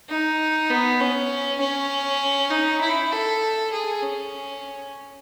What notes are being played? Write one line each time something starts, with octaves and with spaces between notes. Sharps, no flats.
D#4
B3
C#4
C#4
D#4
E4
A4
G#4
C#4